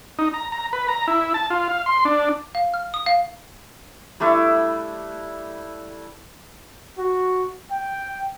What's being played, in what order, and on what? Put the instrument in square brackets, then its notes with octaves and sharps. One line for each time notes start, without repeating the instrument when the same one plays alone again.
[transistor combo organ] D#4
A#5
A#5
B4
A#5
E4
A5
F4
F5
C6
D4
[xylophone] F5
F6
D#6
F5
[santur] G3 A3 D4 E4
[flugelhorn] F#4
G5